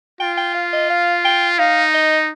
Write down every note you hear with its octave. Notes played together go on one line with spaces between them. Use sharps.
F4 G5
G5
F5
D#5
F5
G5
D#4 F5
D#5